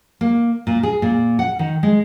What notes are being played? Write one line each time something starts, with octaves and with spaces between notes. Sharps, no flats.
A#3
A#2
G#4
A#2
F#5
D#3
G#3